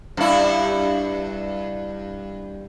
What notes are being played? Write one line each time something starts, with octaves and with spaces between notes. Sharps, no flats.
G2 E4